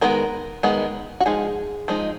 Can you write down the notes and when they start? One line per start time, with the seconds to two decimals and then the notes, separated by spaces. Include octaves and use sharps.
0.01 D#3 G#3 B3 A#4
0.63 D#3 G#3 B3
1.20 F#4
1.26 F3 G#3 D#4 G#4
1.88 F3 G#3 D#4